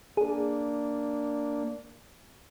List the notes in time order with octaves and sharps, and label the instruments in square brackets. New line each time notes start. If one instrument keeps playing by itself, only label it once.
[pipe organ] A#3 D4 [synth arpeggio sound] G#4